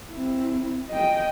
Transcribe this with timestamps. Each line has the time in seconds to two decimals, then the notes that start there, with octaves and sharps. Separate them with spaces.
0.10 C4 E4
0.89 D#5 G5